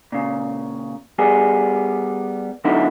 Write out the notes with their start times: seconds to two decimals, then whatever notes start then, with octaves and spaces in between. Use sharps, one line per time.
0.12 A#2 C#3
1.19 G3 B3 G#4
2.65 D3 F#3 B3 D#4 E4